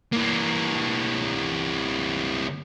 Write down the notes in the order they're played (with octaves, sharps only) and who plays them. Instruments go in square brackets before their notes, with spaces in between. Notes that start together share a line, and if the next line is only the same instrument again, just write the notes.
[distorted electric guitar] E3 A#3